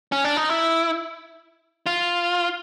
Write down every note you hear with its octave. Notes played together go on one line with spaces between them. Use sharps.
C#4
D4
D#4
E4
F4